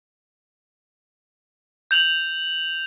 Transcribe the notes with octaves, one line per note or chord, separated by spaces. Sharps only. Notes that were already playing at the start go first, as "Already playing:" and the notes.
G6 F7 F#7